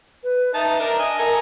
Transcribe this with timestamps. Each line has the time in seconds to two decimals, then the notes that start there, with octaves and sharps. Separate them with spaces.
0.23 B4
0.54 D#4 E5 A5
0.80 D4 A#4
0.99 D#5 G#5
1.19 A4 A#4 G#5 A#5